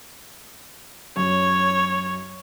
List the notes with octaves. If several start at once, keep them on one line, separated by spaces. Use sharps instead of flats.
F#2 C#5